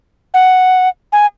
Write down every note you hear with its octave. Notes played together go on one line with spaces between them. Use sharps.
F#5
G#5